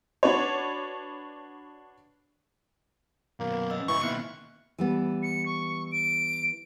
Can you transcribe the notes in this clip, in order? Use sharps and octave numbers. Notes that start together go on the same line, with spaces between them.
D4 F#4 B4 C#5
F#2 B2 A#3
B4
D#5 E6
G#2 C#3 E3 D#5 C#6
B2 D#3 A#3 B3 E4 F#6
E3 G3 B3
C#7
C#6
D7